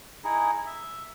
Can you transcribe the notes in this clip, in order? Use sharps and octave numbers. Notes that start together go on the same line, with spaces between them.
D#4 E4 G#4
E5